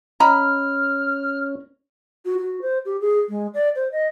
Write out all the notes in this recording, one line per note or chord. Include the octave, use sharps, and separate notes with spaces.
C#4 D#5 A#5 B5 F6
F#4
F#4
C5
G4
G#4
G#3
D5
C5
D#5